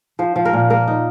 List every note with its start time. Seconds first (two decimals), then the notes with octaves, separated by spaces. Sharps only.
0.19 F3 C5
0.36 F3
0.45 A#4
0.53 A#2
0.70 A#3 A#4
0.88 D#4